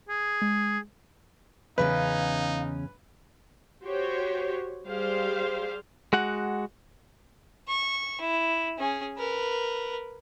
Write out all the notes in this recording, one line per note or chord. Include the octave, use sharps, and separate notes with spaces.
G#4
G#3
E2 C#3 C#4 D#4 B4 F5
F#4 G4 C5 C#5
G3 G4 G#4 C5 F5
G#3 F#4 F#5
C#6
E4
C#4 G#4
A#4 B4